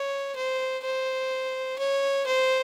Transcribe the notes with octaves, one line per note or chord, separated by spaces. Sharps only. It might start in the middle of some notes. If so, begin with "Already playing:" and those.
Already playing: C#5
C5
C5
C#5
C5